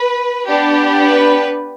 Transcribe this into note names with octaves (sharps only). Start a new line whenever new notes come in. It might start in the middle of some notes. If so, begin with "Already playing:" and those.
Already playing: B4
B3 D4 G4
B4